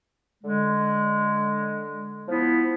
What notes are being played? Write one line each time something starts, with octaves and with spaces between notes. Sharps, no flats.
D3 G#3
F3 B3 E4